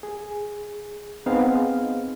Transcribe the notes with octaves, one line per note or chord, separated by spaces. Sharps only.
G#4
B3 C4 D#4 G#4 F5